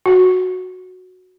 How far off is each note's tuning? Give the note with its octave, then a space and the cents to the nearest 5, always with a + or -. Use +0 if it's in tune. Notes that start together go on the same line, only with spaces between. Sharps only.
F#4 -10